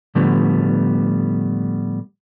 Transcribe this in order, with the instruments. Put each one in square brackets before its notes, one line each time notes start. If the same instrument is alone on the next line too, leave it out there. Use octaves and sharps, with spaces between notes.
[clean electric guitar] A2 D3 F3 G3 A3 B3